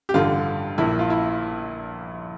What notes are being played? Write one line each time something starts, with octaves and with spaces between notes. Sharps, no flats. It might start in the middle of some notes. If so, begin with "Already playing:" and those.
G4
A1 G2 D3 F4
A#1 A#2 E4
F4
E4